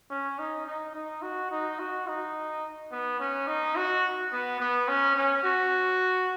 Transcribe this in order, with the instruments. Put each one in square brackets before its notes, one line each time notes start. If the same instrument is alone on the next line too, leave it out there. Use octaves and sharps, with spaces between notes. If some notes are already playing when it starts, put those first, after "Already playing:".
[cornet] C#4
D#4
D#4
D#4
F#4
D#4
F#4
D#4
B3
C#4
D#4
F#4
B3
B3
C#4
C#4
F#4